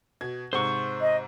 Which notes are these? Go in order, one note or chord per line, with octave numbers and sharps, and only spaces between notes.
B2 G#6
G#2 C3 C5 C#6
D#5